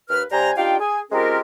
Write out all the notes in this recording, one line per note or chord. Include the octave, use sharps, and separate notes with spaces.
D#2 B4 F6
C3 G3 C5 G#5 A#5
D4 D#4 F4 G4 F5 G5
G#4 G#5
G#3 C4 C#4 F4 G4 A#4